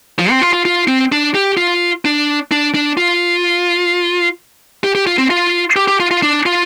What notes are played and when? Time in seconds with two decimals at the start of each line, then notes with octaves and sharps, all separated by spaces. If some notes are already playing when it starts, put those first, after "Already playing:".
0.19 F3
0.30 C4
0.41 F4
0.53 F4
0.65 F4
0.88 C4
1.12 D4
1.34 G4
1.57 F4
2.05 D4
2.51 D4
2.74 D4
2.97 F4
4.84 G4
4.95 G4
5.07 F4
5.18 C4
5.30 F4
5.76 G4
5.88 G4
6.00 F4
6.11 F4
6.23 D4
6.46 F4